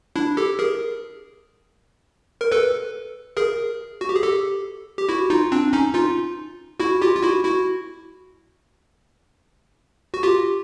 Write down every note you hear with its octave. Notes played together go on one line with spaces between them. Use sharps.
D4 E4
G4 A4
G#4 A#4
A#4
A4 B4
G#4 A#4
F#4
G4
G#4
G4 A4
G4
E4 F#4
D#4 F4
C4 D4
C#4 D#4
D#4 F4
E4 F#4
F4 G4
F4
E4 F#4
E4 F#4
F#4
F4 G4